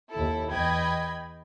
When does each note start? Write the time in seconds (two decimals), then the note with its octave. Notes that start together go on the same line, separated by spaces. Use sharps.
0.10 D#2 E4 A4
0.52 E2 D#5 G5 B5 G#6